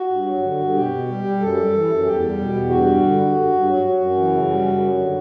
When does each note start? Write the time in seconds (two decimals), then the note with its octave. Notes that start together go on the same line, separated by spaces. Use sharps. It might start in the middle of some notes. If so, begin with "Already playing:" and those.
Already playing: F#4
0.10 G2
0.26 F#3
0.42 D3
0.59 G2
0.75 B2 G4
0.91 B2
1.08 G3
1.24 G3
1.40 F#2 A4
1.57 G3
1.73 E3
1.89 F#2
2.05 E2 G4
2.22 G3
2.38 B2
2.54 E2
2.70 G2 F#4
2.86 G3
3.03 D3
3.19 G2
3.35 G2
3.52 G2
3.68 F#3
3.84 F#3
4.00 F#2
4.16 E3
4.33 C#3
4.49 G3
4.65 F#2
4.81 F#3
4.98 D3